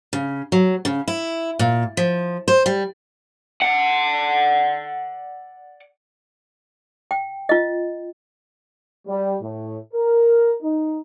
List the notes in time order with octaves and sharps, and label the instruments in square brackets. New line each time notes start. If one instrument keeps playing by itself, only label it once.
[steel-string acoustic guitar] C#3
F#3
C#3
E4
A#2
F3
C5
G3
[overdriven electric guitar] D5 F#5
[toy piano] G5
F4 D#5
[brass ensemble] G3
A2
A#4
D#4